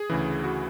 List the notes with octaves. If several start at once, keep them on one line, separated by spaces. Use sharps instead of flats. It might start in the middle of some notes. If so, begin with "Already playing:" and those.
Already playing: G#4
D2 C#3 E3
F#4